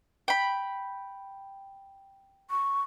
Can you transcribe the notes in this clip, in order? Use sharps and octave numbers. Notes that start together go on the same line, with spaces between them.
G5 B5
C#6